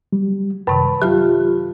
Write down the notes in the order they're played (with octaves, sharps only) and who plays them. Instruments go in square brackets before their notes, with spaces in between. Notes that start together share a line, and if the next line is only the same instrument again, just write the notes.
[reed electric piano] F#3 G3
[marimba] F#2 C3 D#3 [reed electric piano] B4 A5 B5
[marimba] F#3 F6 [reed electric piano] F4 G4